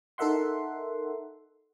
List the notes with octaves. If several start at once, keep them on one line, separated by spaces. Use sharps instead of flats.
D#4 A4 A#4 E5 F#5 C6